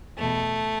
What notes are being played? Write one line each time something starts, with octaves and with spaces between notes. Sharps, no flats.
E2 B2 A3